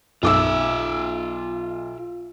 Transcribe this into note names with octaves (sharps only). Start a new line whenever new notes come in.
B1 F4 E5 D6 E6